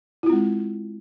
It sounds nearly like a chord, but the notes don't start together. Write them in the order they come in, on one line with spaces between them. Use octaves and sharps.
E4 F4 C4 G#3